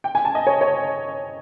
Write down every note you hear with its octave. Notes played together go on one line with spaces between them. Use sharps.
G5
G#5
A5
D#5
C#5
C#5